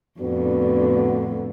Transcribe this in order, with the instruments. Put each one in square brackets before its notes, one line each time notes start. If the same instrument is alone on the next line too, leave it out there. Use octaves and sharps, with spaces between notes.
[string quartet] F2 A2 D3 [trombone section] B3 D4 F#4